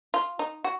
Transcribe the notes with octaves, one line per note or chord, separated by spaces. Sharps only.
F4
D#4
F#4